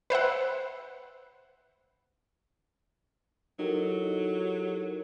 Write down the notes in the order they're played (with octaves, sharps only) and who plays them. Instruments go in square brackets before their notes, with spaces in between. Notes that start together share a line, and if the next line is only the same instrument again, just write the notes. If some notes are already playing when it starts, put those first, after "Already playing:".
[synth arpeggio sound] B4 C5 E5 F#5
[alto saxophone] F#3 [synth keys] D#4 G4 [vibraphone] E4 A4 A#4